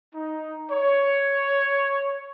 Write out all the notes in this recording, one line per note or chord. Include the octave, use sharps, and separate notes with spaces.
D#4
C#5